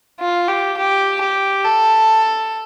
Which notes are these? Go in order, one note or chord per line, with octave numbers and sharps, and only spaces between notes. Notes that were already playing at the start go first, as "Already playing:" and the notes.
F4
G4
G4
G4
A4